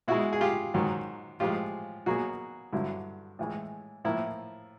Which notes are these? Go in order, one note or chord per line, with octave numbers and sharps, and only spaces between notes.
B2 G#3 E4 F#4
G#4
F4 G4
G#2 D#3 F#3
A2 F3 G#3 F4 G4
B2 F#3 A#3 F#4 G#4
G2 D3 F#3 E4
A2 E3 G#3
A2 F3 A#3 E4